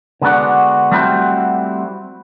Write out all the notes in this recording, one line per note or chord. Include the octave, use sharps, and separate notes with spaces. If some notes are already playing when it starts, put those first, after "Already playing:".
D3 G#3 B3 D4 F#4
G3 A3 C4 E4 F#4 G4